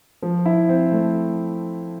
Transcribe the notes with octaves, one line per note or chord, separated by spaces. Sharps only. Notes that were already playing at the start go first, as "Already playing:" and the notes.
F3
E4
C4
A3